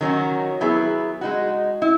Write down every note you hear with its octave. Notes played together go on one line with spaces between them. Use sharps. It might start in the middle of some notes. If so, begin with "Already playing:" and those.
D#3 F#3 C#4 F#4
F#3 B3 E4 G#4
G#3 D#4 F#4
E4